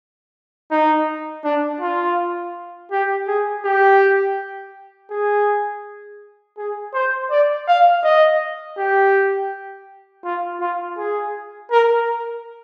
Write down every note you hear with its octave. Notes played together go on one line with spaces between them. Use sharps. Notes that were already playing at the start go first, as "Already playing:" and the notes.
D#4
D4
F4
G4
G#4
G4
G#4
G#4
C5
D5
F5
D#5
G4
F4
F4
G#4
A#4